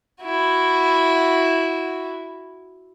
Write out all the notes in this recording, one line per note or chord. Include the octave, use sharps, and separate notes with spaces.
E4 F#4